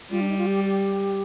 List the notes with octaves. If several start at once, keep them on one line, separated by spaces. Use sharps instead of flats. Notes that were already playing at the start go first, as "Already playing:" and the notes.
G3 F4
D4
D#4
F4
G4
G4